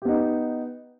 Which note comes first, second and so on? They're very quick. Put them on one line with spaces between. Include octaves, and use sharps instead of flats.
G4 B3 D#4